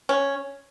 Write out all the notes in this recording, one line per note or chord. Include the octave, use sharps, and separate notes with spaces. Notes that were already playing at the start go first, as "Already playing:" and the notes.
C#4